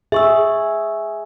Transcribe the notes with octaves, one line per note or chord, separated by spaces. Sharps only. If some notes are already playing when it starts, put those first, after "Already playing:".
G#4 E5 C#6 E6